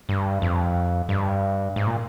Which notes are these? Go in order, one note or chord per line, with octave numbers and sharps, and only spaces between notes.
G2
F2
G2
G#2
A#2